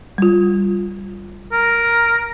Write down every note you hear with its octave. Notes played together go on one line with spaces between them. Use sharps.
G3 F4
A#4